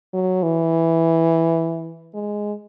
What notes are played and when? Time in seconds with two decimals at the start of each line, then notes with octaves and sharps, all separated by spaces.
0.14 F#3
0.43 E3
2.15 G#3